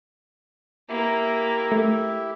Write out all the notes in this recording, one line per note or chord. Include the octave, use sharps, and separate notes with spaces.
A#3 E4 G4 E5
A3